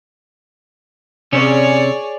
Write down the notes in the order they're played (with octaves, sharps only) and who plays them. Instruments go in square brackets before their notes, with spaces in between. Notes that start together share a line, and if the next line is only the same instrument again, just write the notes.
[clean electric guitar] C3 C#4 [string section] G#4 C#5 D5